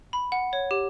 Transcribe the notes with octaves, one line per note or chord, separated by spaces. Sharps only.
B5
F#5
C#5
G4